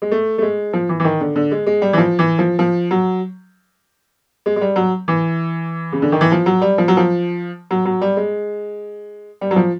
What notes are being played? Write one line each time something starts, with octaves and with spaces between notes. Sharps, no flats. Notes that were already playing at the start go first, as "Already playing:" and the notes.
G#3
A3
A3
G#3
F3
E3
E3
D#3
D3
D3
G#3
G#3
G3
E3
F3
E3
F3
F3
F#3
G#3
G#3
G3
F#3
E3
C#3
D3
D#3
E3
F3
F#3
G3
F3
F#3
F3
F#3
F#3
G3
G#3
G3
F#3
F3